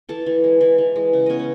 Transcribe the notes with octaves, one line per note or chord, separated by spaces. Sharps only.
E3 A4 A5
E3
G#3
E3
E3
G#3
C#3
B3 C#4 C#5 D#5
C#4